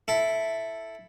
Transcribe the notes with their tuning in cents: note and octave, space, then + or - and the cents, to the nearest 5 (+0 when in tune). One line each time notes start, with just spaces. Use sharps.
E4 +0 A4 +0